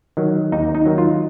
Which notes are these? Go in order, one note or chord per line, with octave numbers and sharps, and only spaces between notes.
D#3 F#3
D#2 D#4
D#4
D#3 F#3
F4